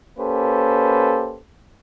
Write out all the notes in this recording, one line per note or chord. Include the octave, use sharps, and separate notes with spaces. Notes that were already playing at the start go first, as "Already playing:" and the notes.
A#3 C#4 G4 A4 B4 C5